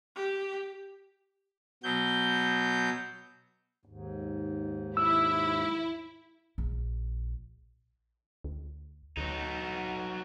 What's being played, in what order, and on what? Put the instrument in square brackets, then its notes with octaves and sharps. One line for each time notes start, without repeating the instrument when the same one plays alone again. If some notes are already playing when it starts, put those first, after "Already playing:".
[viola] G4
[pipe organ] B2 F#3 G6
[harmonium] D#2 G#2
[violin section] E4 [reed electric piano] E6
[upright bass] A#1
[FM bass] D2
[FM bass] D2 [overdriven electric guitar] F#3 D#4